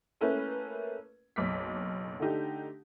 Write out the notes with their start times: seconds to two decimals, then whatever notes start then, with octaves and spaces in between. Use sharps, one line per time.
0.21 A3 A#3 C#4 E4 B4
1.36 F#1 B1 D6 B6
2.20 D3 A3 D4 D#4 G4